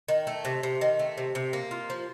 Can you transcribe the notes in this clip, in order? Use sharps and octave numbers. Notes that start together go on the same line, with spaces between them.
D#3
A3
C3
C3
D#3
A3
C3
C3
A#3
F4
F3